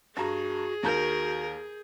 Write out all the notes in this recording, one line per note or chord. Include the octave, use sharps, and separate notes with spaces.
G2 F#4 G#4 A#5
D#2 F#4 A#4 A#5 G6